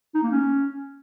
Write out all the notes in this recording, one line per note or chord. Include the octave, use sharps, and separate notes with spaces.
D#4
A#3
C#4